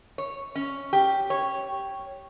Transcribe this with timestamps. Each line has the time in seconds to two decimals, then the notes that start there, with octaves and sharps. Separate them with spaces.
0.18 C#5
0.55 C#4
0.93 G4
1.30 C#5